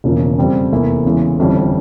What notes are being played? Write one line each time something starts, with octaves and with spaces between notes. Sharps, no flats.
E1 E2 C#3 F3 A#3
F2 C#3 G3 C4
F1 E2 E3 A#3 E4
E2 C#3 E3 G#3
G1 F2 E3 G3 C#4